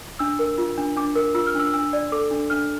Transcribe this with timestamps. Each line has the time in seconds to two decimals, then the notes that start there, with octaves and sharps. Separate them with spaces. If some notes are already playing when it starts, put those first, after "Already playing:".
0.19 D4 E6
0.39 A#4
0.58 F4
0.78 D4
0.97 D4 D6
1.16 A#4
1.35 F4 E6
1.47 F6
1.55 D4 E6
1.74 D4 E6
1.93 D5
2.12 A4 D6
2.31 D4
2.50 D4 F6